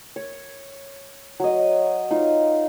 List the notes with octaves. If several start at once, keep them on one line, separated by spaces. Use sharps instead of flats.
C#5
F#3 D#5
D#4 F4